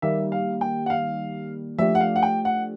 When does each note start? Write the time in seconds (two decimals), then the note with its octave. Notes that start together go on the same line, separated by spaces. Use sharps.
0.02 D#3 G3 A#3 E5
0.32 F5
0.61 G5
0.86 F#5
0.90 F5
1.79 F3 A3 D4 G4 E5
1.95 F#5
2.00 F5
2.16 F#5
2.22 G5
2.45 F#5